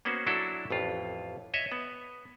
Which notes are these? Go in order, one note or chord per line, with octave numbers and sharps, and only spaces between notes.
A#3 B3 C#4 F#4 C5
F#3 D4 E4 F#4 A4
A1 F2 F4
C#5 D#5 E5
B3